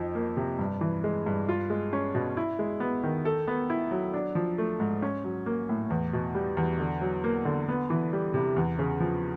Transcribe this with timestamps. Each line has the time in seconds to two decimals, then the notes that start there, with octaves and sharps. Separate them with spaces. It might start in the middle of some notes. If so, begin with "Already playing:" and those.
Already playing: F2 F3 D#4
0.15 A#3
0.37 C3
0.59 G2
0.81 E3
1.04 G#3
1.26 G2
1.49 F4
1.70 G#3
1.93 C#4
2.15 B2
2.37 E4
2.59 G#3
2.80 B3
3.03 D#3
3.25 A4
3.48 B3
3.70 E4
3.91 F#3
4.14 D4
4.35 F3
4.58 A3
4.80 G#2
5.02 C#4
5.24 F#3
5.46 A#3
5.69 A2
5.90 E2
6.13 B2
6.35 G3
6.57 E2
6.79 D3
7.01 F#3
7.24 A#3
7.45 D3
7.69 B3
7.90 E3
8.13 G3
8.34 C3
8.56 E2
8.79 C#3
9.00 F3